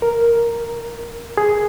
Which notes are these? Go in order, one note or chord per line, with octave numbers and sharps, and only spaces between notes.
A#4
G#4